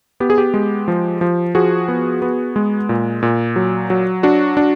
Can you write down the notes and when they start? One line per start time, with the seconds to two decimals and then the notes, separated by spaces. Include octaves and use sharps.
0.20 B3 G4
0.30 G#4
0.38 G4
0.54 G#3
0.88 F3
1.21 F3
1.55 F3 F#4 G#4
1.88 B3
2.22 B3
2.56 G#3
2.89 A#2
3.23 A#2
3.56 F#3
3.90 F#3
4.23 D4 F#4
4.57 D4